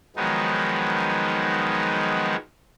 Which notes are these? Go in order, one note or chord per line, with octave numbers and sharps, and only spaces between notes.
D#3 F3 F#3 G#3 B3 D#4